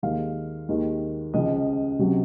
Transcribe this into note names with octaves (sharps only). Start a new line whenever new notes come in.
D#2 D#3 G#3 F5
D#2 D#3 G#3
C#2 C#3 F3 D#5
C#2 C3 F#3